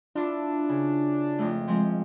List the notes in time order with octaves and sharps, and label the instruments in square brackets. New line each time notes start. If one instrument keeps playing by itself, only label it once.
[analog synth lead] D4 [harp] E4 F4
[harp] C#3
F2 A3
F3 G#3 C4